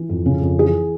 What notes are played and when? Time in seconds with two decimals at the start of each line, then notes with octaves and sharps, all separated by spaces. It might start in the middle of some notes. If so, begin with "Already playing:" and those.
Already playing: E3
0.10 F2
0.26 C#3
0.42 F2
0.59 E3 G#4